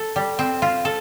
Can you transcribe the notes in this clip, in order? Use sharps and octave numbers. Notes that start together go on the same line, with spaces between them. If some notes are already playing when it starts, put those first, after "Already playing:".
Already playing: A4
G3
C4
F4
A4